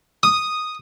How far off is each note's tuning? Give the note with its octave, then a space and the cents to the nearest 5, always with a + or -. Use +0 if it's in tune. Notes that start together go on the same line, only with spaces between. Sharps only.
D#6 -5